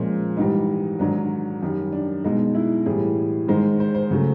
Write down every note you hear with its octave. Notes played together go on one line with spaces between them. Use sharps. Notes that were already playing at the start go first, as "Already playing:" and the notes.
Already playing: A#2 F3 G#3 C#4
G#2 E3 G3 D#4
G#2 D#3 F#3 D4
F#2 D#3 G3
D4
B2 G#3 D#4
E4
A2 E3 G3 G#4
G#2 D#3 G#3 C5
C5
C5
C#3 F#3 A3